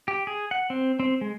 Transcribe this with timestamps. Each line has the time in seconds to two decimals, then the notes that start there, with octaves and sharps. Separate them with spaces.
0.08 G4
0.27 G#4
0.51 F#5
0.70 C4
1.00 C4
1.21 G#3